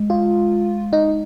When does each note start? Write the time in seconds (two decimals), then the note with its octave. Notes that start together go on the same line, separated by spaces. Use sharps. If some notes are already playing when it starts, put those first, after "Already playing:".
Already playing: G#3
0.10 F4
0.93 D#4